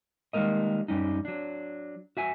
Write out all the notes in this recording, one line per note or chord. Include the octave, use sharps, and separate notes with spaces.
D#3 G3 G#3 A#3 A#4 D#5
F#2 G3 C#4 D#4
F#3 D4
F#4 E5 G#5